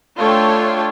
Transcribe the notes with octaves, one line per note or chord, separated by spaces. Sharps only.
A3 D4 F4 A4 C#5 G5